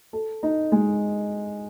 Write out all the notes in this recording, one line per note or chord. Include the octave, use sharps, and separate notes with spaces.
A4
D#4
G#3